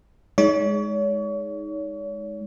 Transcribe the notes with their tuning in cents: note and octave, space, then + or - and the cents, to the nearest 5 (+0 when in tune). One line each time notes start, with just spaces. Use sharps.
G#3 +0 D#4 +10 C#5 +35